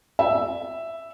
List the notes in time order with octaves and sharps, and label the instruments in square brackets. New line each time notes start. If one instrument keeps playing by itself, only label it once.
[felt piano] E5